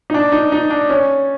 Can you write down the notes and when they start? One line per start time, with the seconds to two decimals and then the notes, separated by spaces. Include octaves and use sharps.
0.10 D#4
0.14 D4
0.32 D#4
0.52 D#4
0.70 D4
0.90 C#4